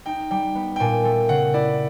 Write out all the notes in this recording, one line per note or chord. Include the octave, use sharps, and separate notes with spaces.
D#4 G5
G3 G5
B3
G5
A#2 G#5
A3 G5
C#3 F#5
E4 D5